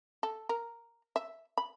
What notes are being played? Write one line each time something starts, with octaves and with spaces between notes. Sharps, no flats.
A4
A#4
E5
B5